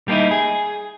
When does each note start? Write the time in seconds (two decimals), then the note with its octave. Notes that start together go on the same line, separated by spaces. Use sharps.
0.08 G3 A#3 C#4 D#4 E4
0.31 G#4